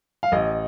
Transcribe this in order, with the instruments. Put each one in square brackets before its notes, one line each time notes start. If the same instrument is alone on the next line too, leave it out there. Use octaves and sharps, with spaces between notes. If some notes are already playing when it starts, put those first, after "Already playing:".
[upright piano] F5
A1 D#5